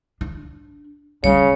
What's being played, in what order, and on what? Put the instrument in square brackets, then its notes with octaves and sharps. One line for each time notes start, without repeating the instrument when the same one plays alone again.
[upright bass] D4
[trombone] C#3 [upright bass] G3 F4 [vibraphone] C#5